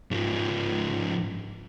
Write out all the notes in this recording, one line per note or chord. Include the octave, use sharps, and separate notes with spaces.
G#2 F3